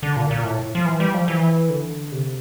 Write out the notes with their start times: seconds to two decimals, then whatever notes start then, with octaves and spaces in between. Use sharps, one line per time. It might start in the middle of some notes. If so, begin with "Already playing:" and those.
0.03 D3
0.16 A#2
0.31 A#2
0.44 A2
0.75 F3
0.86 E3
1.00 G3
1.14 F3
1.28 E3
1.70 D3
2.12 C3